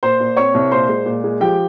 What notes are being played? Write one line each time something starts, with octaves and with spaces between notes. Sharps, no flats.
A#2 C5 C6
A#2
C4 C#5 C#6
C2
A#2 C5 C6
G#3
A#2
G#3
F3 G4 G5